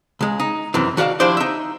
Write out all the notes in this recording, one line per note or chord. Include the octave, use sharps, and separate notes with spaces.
C#2 G#3
D#4
F#2 C3 D#3 E3
D#3 F#4 D5 F5 A5
F3 D4 E4 G4 C5 D5
D#4 E5